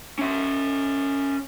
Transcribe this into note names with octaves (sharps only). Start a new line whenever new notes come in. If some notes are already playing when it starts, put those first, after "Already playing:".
C#4 E5